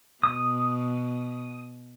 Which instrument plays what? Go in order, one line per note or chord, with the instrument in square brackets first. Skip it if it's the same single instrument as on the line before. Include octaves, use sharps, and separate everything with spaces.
[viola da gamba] B2 [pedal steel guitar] D#6